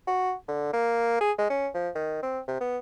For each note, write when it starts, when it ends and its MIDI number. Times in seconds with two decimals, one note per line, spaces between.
0.07 0.34 66
0.48 0.73 50
0.73 1.17 58
1.21 1.32 68
1.38 1.46 56
1.50 1.68 61
1.74 1.90 53
1.95 2.19 51
2.23 2.40 60
2.48 2.60 48
2.61 2.78 59